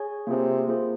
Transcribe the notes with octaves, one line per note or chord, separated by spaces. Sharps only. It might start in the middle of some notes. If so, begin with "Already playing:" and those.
Already playing: G#4 C#5 G#5
C3 A#3 F4 G#4 C5
A#3 F4 G#4 C5